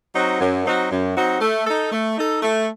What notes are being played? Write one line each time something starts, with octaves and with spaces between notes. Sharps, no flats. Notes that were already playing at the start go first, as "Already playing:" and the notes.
F#3 C4 D#4 F#4
F#2
F#3 C4 D#4 F#4
F#2
F#3 C4 D#4 F#4
A3
D#4 A4
A3
D#4 A4
A3